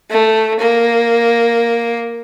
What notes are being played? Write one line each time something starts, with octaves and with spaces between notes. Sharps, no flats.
A3
A#3